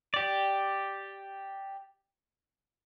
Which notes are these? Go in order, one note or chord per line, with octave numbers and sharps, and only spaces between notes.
G4 D5